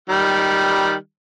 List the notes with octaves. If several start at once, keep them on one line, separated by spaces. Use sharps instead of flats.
D#3 G3